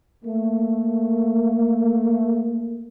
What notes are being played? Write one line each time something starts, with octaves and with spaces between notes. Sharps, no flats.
A3 A#3